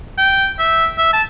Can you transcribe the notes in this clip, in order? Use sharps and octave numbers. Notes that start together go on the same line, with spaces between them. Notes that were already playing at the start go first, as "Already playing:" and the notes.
G5
E5
E5
A5